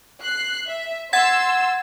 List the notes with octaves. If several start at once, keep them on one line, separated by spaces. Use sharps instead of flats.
F#6 C7
E5
F#5 C6 E6 G#6 A6